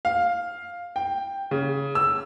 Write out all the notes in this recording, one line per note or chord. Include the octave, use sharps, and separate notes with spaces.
F5
G5
C#3
E6